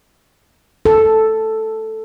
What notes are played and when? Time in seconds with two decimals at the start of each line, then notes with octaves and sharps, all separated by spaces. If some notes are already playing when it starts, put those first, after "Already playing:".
0.85 A4